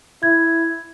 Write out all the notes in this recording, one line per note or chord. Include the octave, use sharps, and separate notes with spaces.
E4 G#6